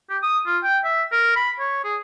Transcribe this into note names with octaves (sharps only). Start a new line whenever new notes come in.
G4
D#6
F4
G5
E5
A#4
B5
C#5
G#4